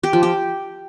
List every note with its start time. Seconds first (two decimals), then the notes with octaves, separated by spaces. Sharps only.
0.03 G4
0.13 F3
0.23 G4